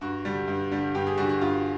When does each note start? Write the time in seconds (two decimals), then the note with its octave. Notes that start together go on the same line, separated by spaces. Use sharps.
0.01 G2 F#4
0.25 D3 G3
0.48 G2
0.71 D3 G3
0.95 G2 G4
1.07 G#4
1.17 D3 G3 F#4
1.29 F#4
1.41 G2 F4